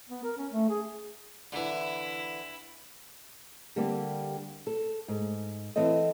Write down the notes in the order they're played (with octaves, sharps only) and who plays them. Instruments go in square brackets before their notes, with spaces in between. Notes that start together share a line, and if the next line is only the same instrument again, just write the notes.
[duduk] B3
A#4
C#4
A3
G#4
[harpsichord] D3 E3 [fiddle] E4
[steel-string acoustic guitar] D3 G3 A#3 C4 G4
A4
G#2
E3 C4 A4 C5 D#5